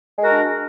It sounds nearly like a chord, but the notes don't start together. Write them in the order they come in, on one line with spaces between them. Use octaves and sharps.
G#3 A#4 F#4 D4